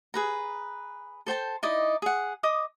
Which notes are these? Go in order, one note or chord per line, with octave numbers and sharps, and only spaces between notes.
G#4 B4 A#5
A4 C5 G5 A5
D#4 E4 D5 D#5
G#4 F#5
D#5 D6 D#6